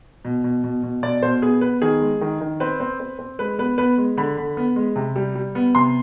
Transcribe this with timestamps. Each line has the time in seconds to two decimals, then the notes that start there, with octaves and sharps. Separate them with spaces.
0.25 B2
0.44 B2
0.64 B2
0.83 B2
1.03 B2 D5
1.23 B2 C5
1.42 B3 G#4
1.61 B3 B4
1.82 D#3 G#4
2.01 G#3
2.21 D#3
2.41 D#3
2.60 C4 B4
2.80 C4
3.00 C4
3.19 C4
3.39 G#3 B4
3.59 B3 B4
3.78 B3 B4
3.98 G#3
4.17 D3 B5
4.37 D3
4.57 B3
4.76 G#3
4.96 C3
5.16 G3
5.35 G3
5.55 B3
5.75 C3 C6